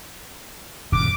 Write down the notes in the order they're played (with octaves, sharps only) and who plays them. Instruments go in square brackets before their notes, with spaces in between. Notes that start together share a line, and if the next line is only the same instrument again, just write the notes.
[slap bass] D#1 F#2 C#3 [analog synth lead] D6